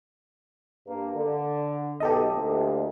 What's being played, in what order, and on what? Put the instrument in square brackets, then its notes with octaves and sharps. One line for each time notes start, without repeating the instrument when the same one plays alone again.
[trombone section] G2 A#3
D3
[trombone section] B1 [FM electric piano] G4 A4 D#5
[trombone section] D2 A#2